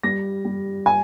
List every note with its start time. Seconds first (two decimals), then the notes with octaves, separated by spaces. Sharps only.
0.03 G3 A#6
0.45 G3
0.86 G#5